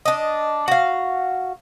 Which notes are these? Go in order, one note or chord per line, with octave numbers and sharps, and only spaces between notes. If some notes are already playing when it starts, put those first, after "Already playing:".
D4 D#5
F#4 F5